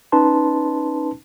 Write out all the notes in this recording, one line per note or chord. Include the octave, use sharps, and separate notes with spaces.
C#4 D#4 B4 A5 C6